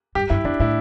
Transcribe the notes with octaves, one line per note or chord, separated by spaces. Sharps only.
G2 G4
G2 E4
F2 D4
A2 E4